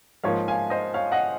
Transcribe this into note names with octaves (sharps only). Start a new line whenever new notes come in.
G#2 F3 A#3 C#5 F5
F5 G#5
C5 D#5
C#5 F5
D#5 F#5